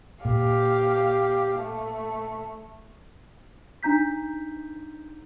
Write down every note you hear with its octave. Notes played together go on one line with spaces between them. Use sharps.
A#2 G4 F5
A3
D4 D#4 A#5 G6 B6